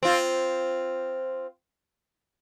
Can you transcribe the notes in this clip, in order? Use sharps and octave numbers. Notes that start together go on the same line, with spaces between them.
C4 F4